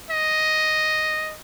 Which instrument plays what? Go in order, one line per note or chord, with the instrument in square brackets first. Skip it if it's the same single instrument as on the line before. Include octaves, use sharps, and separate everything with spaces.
[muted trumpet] D#5